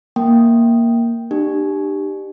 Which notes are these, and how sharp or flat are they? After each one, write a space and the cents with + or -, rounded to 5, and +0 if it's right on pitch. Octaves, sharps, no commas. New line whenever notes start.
A#3 +0 G5 +0
D4 +40 G4 +0